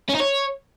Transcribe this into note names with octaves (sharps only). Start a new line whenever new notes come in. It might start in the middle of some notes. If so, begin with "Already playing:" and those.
C#4
D#4
C#5